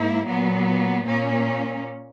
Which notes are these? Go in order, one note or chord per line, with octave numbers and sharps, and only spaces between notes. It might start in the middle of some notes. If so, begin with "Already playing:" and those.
Already playing: G#2 A#3 E4
A#2 F#3 B3
A#2 A#3 C#4